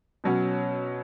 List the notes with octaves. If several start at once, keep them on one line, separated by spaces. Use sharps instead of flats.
B2 F#3 C#4 F#4